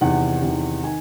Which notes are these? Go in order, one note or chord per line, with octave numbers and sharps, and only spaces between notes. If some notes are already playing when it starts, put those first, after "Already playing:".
E2 C3 D#3 F#5
E2 C3 D#3
D#3 G#5